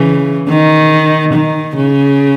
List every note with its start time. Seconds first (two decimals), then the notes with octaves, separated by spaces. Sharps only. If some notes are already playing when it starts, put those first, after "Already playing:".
Already playing: C#3 E3
0.48 D#3
1.33 D#3
1.76 C#3